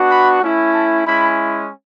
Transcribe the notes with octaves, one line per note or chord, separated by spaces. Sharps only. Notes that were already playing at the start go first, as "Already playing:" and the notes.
Already playing: B3 D4 F#4
B5
A3 C#4 E4
A5
G#3 C#4 E4 B5